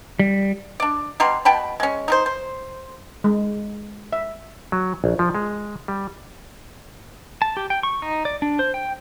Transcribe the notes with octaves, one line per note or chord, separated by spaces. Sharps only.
G3
D4 D5
B2 G3 A#5 C6
B2 G5 A5 B5
G#3 C#4
D#4 A#4 C5
C5
G#3
E5
F#3
A#1
F3
G#3
G3
A5
G4
G5
C#6
D#4
D5
D4
C5
G5